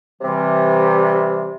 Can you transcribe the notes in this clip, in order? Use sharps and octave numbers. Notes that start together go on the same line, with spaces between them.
C3 E3 G3